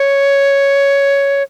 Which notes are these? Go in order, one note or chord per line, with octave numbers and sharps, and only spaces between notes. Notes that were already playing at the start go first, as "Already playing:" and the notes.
Already playing: C#5